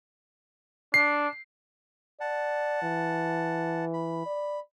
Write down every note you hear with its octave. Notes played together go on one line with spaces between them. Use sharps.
D4 C7
D5 F#5 A5
E3
B5
D5